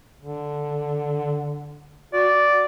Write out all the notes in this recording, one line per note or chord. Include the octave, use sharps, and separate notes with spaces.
D3
F#4 D5